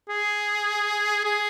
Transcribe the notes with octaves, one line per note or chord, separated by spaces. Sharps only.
G#4
G#4